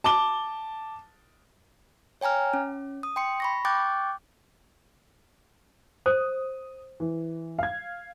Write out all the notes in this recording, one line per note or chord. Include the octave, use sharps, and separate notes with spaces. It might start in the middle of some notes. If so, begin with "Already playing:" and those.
A5 D6 G7
C#5 G5 G#5 A#5 F6
C#4
D#6
G5 C6 C#7
B5 C#6 A#6
G5 C#6 D6 F#6 G6 A6
C5 D#6
E3
F5 G#6